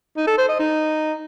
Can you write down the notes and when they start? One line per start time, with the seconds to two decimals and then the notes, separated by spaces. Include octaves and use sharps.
0.16 D#4
0.27 A4
0.38 C5
0.49 D#5
0.59 D#4